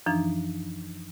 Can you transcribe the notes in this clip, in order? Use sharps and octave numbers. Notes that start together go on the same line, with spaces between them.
F#2 E3 F3 D4 D#4